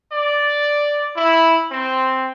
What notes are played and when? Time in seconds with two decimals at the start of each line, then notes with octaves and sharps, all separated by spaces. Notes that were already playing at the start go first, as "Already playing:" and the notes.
0.13 D5
1.16 E4
1.72 C4